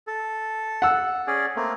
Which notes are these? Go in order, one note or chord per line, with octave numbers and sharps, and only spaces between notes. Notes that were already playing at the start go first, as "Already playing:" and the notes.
A4
F#5 E6
C#4 G#4 D5
A3 A#3 C4